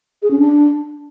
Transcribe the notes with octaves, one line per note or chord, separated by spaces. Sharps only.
G#4
C#4
D4